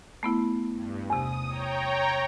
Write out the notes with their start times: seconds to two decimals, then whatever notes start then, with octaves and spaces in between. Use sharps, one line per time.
0.23 A3 B3 E4
0.73 G2
1.10 E2 C3 D#6
1.48 C#5 G5 A#5